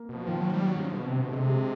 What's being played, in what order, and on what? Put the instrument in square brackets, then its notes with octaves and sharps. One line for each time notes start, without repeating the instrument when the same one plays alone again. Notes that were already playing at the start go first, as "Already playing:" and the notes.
Already playing: [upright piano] A#3
[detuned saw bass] B2 [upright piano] F3
[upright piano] D#3 [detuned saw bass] F3
[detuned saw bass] F#3
G3
F#3
[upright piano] C#3
[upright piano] D3 [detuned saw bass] F3
[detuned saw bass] B2
C3
B2
[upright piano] A3
[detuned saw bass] C3 [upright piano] G#3
[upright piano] G3